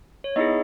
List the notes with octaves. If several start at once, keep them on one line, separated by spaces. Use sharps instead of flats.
C#5
B3 D#4 E4 G#4 D#5